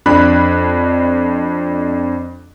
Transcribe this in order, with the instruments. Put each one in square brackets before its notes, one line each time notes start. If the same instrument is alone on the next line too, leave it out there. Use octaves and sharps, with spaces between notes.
[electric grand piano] F2 D4 B5 F#6